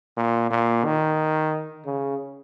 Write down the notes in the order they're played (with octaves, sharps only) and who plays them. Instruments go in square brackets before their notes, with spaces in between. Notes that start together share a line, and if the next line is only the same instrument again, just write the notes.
[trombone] A#2
A#2
D#3
C#3